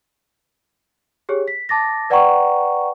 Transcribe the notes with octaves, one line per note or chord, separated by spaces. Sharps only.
G4 G#4 C#5
B6
A5 D6 A6 A#6
B4 D5 F#5 G5 A#5 C#6